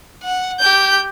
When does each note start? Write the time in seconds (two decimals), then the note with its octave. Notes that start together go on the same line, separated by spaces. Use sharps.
0.23 F#5
0.60 G4 G6